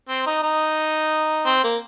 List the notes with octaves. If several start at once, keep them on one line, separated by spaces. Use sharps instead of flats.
C4
D#4
D#4
C4
A#3